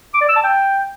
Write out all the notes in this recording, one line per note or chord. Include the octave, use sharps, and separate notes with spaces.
D6
D5
E6
A5
G5